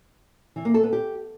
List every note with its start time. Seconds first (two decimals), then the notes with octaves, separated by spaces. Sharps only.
0.56 E3
0.65 A#3
0.74 A4
0.83 B3
0.93 G4